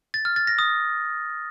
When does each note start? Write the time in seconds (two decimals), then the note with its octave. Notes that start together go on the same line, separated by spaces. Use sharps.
0.14 A6
0.25 F6
0.36 A6
0.47 A#6
0.59 D#6